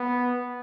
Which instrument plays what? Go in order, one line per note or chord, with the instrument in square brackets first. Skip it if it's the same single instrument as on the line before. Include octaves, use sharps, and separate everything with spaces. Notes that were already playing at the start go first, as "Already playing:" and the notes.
Already playing: [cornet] B3